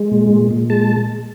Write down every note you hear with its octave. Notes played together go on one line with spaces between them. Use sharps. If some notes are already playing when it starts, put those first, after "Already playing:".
Already playing: G#3
A#2
A#2
A#2
G#3 A5